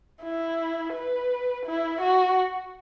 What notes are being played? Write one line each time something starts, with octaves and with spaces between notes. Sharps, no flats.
E4
B4
E4
F#4